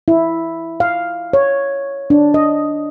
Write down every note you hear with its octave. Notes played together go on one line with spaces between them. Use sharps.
E4
F5
C#5
D4
D#5